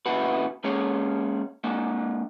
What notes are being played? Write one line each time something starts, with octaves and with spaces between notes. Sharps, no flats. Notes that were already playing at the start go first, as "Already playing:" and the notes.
A#2 C#3 E3 E4 F#4 B4
G#3 A#3 C#4 G#4 C#5
G#3 A#3 D4